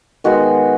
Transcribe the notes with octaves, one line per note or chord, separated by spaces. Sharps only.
D#3 G#3 B3 F#4